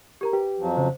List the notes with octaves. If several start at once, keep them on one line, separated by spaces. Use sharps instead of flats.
G4 A#4 A#5
G4 B4
F2 F3 F#3
C#3 C5